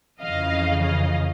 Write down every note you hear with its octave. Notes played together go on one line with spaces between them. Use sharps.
F2 C#3 E3 D#5 F5
D#5 F5